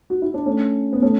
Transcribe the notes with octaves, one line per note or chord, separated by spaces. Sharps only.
F#4
E4
D4
A3 C#4
B3
A3 C#4